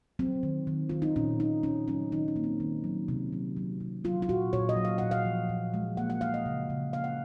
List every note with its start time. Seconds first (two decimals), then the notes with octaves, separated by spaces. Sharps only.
0.19 F#3 C4
0.43 D#3
0.67 D#3
0.89 D#3 F4
1.02 D#4
1.16 A#2 C#4
1.39 A#2 D#4
1.63 A#2 C#4
1.87 F#3 C#4
2.12 D#3 D#4
2.28 C#4
2.36 A#3
2.44 C4
2.60 D#3
2.84 F#3
3.08 C3
3.33 F#3
3.57 F#3
3.80 C3
4.04 F#3 F4
4.22 F4
4.29 A#2 F#4
4.53 A#2 C#5
4.69 D#5
4.76 F#3
4.85 F5
4.98 A#2 F#5
5.11 F5
5.26 F3
5.49 A#2
5.74 G#3
5.97 A#3 F#5
6.10 F#5
6.21 A#3 F5
6.34 D#5
6.46 C#3
6.70 C#3
6.93 A#3 F5
7.04 F#5